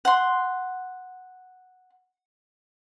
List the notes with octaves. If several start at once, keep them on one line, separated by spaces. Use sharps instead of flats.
F#5 C6